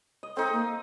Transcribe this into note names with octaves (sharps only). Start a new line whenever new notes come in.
D#5
C4 D#4 A4
A#3